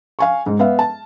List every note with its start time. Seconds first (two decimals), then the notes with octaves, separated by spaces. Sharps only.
0.19 F5 G#5 C#6
0.46 G#2
0.59 B3 E5 F5
0.79 A5